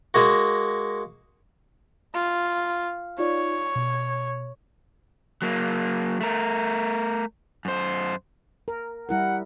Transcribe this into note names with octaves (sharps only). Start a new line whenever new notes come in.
G#3 A#3 F#4
F4
D#4 F4 C#5 D5
B2
F#3 A#3
A3 A#4
F#2 C5
A#4
G3 E4 A#4 F#5